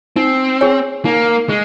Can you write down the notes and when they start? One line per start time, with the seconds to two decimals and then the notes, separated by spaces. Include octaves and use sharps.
0.16 C4 D#4
0.61 G#4 C#5 G#5
1.05 A#3 D#4
1.49 G#3 G#4